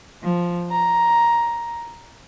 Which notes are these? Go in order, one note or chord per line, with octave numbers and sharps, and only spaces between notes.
F3
A#5